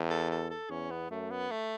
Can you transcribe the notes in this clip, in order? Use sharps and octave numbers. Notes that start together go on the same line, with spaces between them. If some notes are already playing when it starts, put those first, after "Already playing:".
Already playing: E2
A4
A4
A4
E2 C#4
B3
F#2 A3
B3
A3